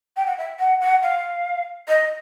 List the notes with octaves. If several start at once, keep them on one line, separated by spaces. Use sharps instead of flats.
G5
F#5
E5
F#5
F#5
F5
D#5